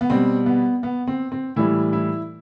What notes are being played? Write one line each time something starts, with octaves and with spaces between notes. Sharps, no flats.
B3
B2 G3 C4
B3
B3
C4
C4
A2 E3 G3 E4
E4